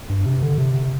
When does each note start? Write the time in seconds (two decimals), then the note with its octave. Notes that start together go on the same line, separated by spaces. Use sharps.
0.09 G2
0.26 C3
0.42 D3
0.58 C3